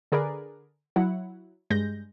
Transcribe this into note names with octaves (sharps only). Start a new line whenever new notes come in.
D3 G#4 A#4 B4 D5
F#3 E4 F#5
G2 G#3 G6 A#6